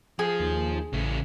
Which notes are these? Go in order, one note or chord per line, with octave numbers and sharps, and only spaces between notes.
F3 G#4
D#2
A1 C#3 A3